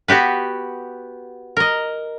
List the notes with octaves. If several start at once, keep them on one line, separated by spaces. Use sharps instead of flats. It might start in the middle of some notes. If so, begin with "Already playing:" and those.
B3 F#4 G4 B4
A#4 D#5